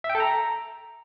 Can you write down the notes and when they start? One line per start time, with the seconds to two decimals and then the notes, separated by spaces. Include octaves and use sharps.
0.04 E5
0.10 G5
0.15 A4
0.20 A#5